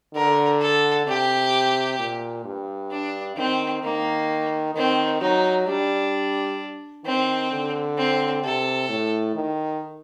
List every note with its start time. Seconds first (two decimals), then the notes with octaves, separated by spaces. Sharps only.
0.15 D3 A#4
0.61 A4
1.07 C3 G4
1.99 A#2
2.45 G2
2.91 D4
3.37 D#3 C4
3.83 D#3 A#3
4.75 D#3 C4
5.21 F#3 D#4
5.67 G3 D4
7.05 D#3 C4
7.51 D3
7.97 C4
8.44 C3 A4
8.89 A2
9.35 D#3